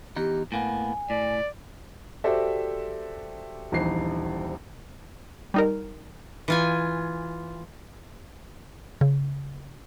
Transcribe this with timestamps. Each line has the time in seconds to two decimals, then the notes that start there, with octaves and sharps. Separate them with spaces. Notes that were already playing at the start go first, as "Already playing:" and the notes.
0.16 E2 D#4 G4
0.52 A2 A#3 B3 G#5
1.10 A2 D5
2.24 F#4 G4 A4 C5 D5 E5
3.72 D#1 A#1 E3 D#4 C7
5.54 G3 D#4 A#4
6.48 E3 F4 G#5
9.01 C#3